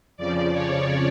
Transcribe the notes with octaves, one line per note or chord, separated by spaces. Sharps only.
F2 C#3 F3 D5
C#5